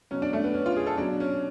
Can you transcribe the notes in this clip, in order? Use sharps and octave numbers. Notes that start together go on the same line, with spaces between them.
B2 F#3 C#4
D4
A3
B3
C#4
F4
G#4
A4
B2 F#3 D4
C#4